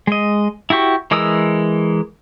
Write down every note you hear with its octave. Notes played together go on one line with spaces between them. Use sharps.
G#3 D#5
E4 F#4 G4 C#6
E3 G#3 A#4 D#6 E6